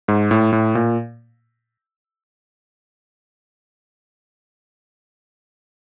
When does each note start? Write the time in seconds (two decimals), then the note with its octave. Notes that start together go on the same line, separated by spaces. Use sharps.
0.08 G#2
0.31 A2
0.53 A2
0.75 A#2